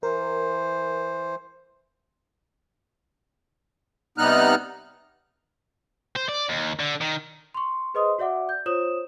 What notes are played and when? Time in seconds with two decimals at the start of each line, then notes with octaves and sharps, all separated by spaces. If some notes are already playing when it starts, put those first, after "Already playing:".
0.03 E3 A#4 C5
4.18 C3 G3 B3 D#4 F6 F#6
6.16 C5
6.29 D5
6.49 D#2
6.80 D3
7.01 D#3
7.54 C6 C#6
7.94 G#4 B4 C5 D#5 C6 D#6
8.18 F#4 D5 E5 F#5 D6
8.49 G6
8.66 F4 C5 C#5 D#6 E7